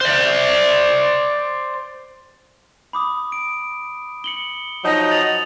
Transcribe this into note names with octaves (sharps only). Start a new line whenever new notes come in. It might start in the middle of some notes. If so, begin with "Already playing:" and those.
C5 D5
B5 D6 D#6
D7
C#7 F#7 G7
F3 F#3 D#4
A6 F7 F#7